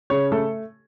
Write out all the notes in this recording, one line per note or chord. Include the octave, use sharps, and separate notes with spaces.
C#3 C#5
A3 A4